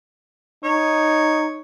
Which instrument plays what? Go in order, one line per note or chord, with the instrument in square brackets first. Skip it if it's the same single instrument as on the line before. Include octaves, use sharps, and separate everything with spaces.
[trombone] D#4 [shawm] C#5